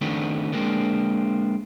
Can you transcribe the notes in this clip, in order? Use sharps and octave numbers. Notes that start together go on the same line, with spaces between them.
D#3 A3 B3 C4 D4
G#3 A#3 C4 D4